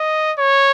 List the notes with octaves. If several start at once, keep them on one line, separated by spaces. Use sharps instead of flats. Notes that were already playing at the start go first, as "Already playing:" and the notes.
Already playing: D#5
C#5